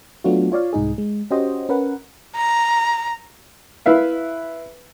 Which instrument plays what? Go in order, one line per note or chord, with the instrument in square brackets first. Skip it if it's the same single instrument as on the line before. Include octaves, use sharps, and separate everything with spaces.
[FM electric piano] F#3 A3 B3 D4 F4 F#4
F4 C#5 D5 F5
C2 G#2 D#4 G#4
G#3
C#4 F#4 G4 C5 D#5
C#4 A#4 B4 F#5
[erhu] A#5
[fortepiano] E4 B4 E5 F5